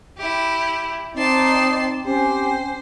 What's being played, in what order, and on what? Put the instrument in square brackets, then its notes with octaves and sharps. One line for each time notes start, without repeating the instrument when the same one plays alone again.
[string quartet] E4 G4
[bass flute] C4 [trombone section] D#4 [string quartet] D5 A5 C6
[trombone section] C4 G4 [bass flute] C#4 [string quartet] C5